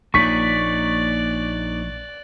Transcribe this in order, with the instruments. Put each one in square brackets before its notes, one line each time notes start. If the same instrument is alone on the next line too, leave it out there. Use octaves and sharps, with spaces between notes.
[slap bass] A#1 [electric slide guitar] A#3 D#4 C#5 [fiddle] D5 F#6 [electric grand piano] C#6 B6